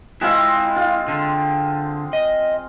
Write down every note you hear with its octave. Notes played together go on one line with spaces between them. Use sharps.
G#3 C4 E4 F4
F4
D3
D#5